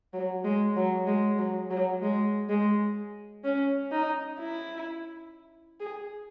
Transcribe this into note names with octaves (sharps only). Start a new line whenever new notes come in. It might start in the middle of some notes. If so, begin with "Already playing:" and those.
F#3
G#3
F#3
G#3
F#3
F#3
G#3
G#3
C#4
D#4
E4
G#4